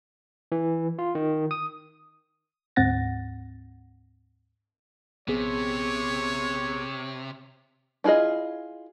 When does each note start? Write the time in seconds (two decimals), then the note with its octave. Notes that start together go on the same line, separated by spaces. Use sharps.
0.52 E3
0.99 F4
1.15 D#3
1.51 D#6
2.76 D2 G#2 C4 F#5 A6 A#6
5.28 A#1 C3 B3 G#4 C#5
8.04 D4 E4 F4 G#4 D#5